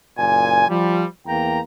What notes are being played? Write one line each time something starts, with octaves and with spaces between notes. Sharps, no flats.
F#1 A#2 G#5
F3 G3
E2 A#3 G5 A#5